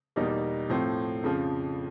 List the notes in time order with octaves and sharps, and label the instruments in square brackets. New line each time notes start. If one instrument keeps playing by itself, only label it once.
[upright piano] E2 B2 G3 A#3 D#4
A2 F3 A3 C4
F2 C#3 F3